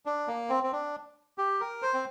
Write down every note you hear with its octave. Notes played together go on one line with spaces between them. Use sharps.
D4
A#3
C4
C4
D4
G4
A#4
C5
C4